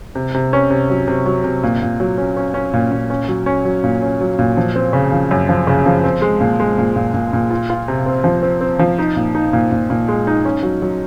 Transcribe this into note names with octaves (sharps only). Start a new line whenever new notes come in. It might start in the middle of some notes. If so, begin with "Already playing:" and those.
C3
C3
C#4
C3
F#3
C3
F#3
C3
A#2
A#2
F#3
C#4
C#4
C#4
A#2
A#2
C#4
F#3
C#4
F#3
A#2
C#4
F#3
A#2
F3
C4
C#3
F3
F#2
F3
C#3
F3
C4
G#3
A#2
G#3
A#2
A#2
A#2
A#2
F4
F4
C3
C4
F3
C4
C4
F3
D#4
A#2
D#4
A#2
A#2
A#2
G#3
D#4
C#4
F#3
F#3